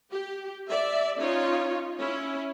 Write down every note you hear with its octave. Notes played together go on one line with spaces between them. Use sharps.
G4
D5 E5
C#4 D#4 F4 C#5
C#4 E4